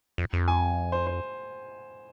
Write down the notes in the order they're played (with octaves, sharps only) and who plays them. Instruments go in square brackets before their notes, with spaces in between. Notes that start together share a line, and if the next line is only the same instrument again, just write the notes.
[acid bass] F2
F2
[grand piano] G#5
C5
C5